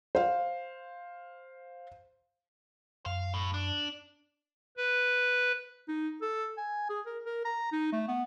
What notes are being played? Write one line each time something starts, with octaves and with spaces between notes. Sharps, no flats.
C5 F5
F#2 F5
A2
D4
B4
D#4
A4
G#5
G#4
A#4
A#4
A#5
D#4
A3
B3